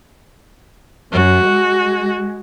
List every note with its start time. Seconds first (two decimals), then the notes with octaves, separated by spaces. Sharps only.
1.13 F#2 F#4
1.44 G#3